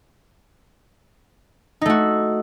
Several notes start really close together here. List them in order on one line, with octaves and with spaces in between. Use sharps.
D#4 A3 F#4